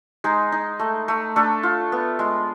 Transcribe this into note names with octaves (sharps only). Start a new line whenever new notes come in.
G#3 D#4 G#4
D#4
A3
A3
A3 D4 A4
F4
B3
G#3